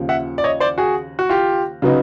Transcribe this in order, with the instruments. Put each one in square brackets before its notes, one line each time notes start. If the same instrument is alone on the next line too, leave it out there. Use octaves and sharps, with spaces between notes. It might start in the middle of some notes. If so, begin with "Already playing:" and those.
Already playing: [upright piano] D#2 C#3 F3
[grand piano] E5 F#5
D5
C#5 D#5
C5 D5
F#4 G#4
F#4
F4 G4
[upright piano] C#3 F#3 B3 D#4